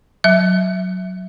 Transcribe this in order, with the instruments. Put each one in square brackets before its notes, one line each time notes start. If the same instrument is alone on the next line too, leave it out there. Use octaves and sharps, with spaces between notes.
[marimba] F#3 E5